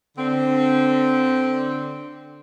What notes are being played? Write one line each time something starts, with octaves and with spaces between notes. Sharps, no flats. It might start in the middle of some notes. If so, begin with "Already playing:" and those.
D3 C4